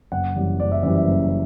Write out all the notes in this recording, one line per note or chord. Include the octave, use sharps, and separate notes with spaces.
F#1 F#5
F#2 E3 G3
F#1 D5
E5
F#2 E3 G3 E5
E5
F#1